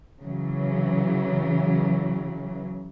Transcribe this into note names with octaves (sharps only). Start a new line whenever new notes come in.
C#3 E3 F#3